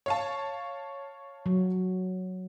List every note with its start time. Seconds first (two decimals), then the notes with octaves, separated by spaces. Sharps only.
0.06 C#5 F5 A5
1.46 F#3